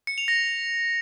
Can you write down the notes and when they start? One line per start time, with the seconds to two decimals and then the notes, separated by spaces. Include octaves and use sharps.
0.07 C#7
0.18 F7
0.28 A#6